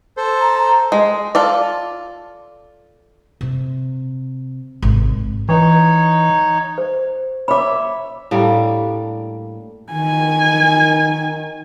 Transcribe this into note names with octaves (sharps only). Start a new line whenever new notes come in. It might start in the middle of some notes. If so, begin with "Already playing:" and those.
A4 C5
A#5
G#3
F4 A4 D5
C3
G#1 C3
E3 D#4 C#5
C5
C#5 E5 B5 D6
A2 G3 A#3 D4
D#3 G#5